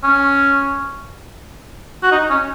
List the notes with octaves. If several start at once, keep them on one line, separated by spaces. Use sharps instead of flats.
C#4
F#4
D#4
C#4